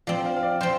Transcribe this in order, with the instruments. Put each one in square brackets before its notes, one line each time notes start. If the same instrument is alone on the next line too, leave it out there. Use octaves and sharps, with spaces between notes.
[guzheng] F3 C4 [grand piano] D5
[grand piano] F5
F5
D5
[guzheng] F3 C4 [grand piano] C5